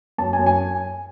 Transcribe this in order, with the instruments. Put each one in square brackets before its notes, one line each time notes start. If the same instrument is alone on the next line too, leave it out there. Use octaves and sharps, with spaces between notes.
[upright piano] F#2 A5
G#5
F#2
G#5